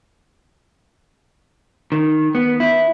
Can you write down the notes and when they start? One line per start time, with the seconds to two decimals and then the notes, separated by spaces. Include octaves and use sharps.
1.92 D#3
2.35 B3
2.60 E4